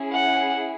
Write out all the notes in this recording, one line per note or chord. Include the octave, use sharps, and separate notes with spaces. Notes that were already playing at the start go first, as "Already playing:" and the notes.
Already playing: C#4 E4 G#4
F#5